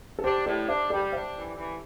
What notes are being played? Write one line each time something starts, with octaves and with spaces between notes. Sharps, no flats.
A4
D4 G4 C5
A2 A4 D5
D4 C5 E5
G3 A4 D5
G5
D4 C5 E5
E3
E3